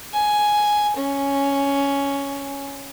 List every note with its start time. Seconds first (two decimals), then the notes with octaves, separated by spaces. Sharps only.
0.13 G#5
0.96 C#4